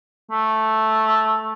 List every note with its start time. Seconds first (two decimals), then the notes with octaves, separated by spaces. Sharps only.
0.31 A3